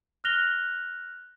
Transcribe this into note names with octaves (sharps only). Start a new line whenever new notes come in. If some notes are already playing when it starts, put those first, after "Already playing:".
F6 F#6 A#6 F7 G7